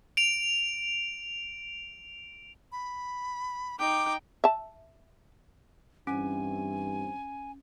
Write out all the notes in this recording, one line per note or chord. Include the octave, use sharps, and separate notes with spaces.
D7 F7
B5
D#4 G5 D6
E5 A5
G2 E3 C4 C#4 G#5